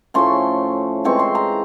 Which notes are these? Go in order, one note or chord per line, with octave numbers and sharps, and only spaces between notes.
A2 F3 A3 C#4 C6
A2 E3 G#3 C4 C#6
C6
A#5